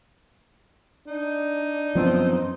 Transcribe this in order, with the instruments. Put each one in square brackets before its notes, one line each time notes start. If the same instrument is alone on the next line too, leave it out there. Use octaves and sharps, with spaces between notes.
[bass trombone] D4 [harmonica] D#4
[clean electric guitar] F#2 C4 C5 [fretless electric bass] F3 B3